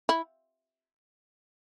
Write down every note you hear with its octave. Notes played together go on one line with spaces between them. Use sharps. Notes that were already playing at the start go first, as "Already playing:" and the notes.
E4